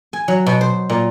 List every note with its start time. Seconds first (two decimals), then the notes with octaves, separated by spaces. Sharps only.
0.13 G#5
0.28 F#3
0.46 B2
0.61 C5
0.89 A#2